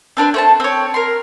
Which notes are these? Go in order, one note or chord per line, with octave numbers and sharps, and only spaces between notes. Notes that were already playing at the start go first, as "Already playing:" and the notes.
C4 D4 A#4 B4
A3 C5 A5
C4 C#5
A#4 C6